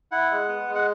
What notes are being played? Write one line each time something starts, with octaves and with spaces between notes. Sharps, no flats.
E4 F#5
G#3
B3
G#3
F#5